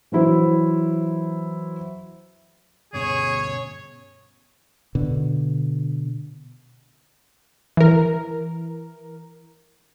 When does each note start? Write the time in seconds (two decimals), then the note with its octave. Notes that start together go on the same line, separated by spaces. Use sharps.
0.12 E3 F#3 E4 C5
2.93 D2 G2 B2 C#4 G#4 C#5
4.95 B2 D3
7.77 E3 A#4